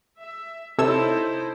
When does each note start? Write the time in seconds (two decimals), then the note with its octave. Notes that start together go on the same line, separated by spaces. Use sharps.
0.20 E5
0.79 C3 D#4 E4 A4 C5 C#5 E6